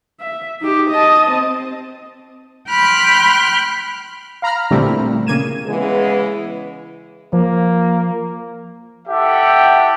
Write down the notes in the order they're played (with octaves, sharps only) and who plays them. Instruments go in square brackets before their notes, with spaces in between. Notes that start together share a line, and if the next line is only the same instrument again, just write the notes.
[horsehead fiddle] E5
D#4 G4
D#5 A5
C4
[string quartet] G5 B5 C6 F6 F#6
[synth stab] F5 A#5 B5 F6
A#2 D3 G3 A3 C4 E4
C#3 A#3 G#6 D#7 E7
[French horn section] C#3 E3 G#3 B3
[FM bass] F3 [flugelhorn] A#3
[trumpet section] E4 G4 A4 E5 F#5 G5